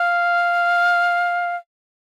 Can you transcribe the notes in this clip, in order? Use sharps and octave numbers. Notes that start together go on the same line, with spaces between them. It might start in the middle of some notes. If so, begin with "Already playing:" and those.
Already playing: F5